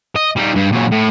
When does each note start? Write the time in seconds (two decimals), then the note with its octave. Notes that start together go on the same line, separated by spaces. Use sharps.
0.16 D#5
0.36 G3 D#4
0.55 G2
0.72 A#2 F#3
0.91 A2